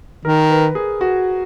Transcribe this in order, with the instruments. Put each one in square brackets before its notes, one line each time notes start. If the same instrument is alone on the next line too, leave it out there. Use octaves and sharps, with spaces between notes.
[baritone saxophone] D#3 [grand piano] A#4
[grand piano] B4
G#4
F#4